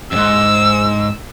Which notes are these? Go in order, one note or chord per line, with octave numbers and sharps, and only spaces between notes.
F2 G#2 E6